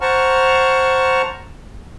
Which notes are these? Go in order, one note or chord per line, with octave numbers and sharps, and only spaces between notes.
C5 F#5 A5 A#5 C#6 F6